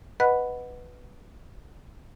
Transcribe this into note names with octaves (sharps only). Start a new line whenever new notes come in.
B4 D#5 F#5 B5 F#6